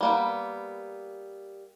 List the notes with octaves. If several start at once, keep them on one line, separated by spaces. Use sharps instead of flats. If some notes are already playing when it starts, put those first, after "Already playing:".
G3 A#3 B3